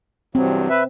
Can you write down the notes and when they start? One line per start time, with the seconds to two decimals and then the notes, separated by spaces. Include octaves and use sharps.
0.35 E2 G2 F#3 C4
0.70 B4 E5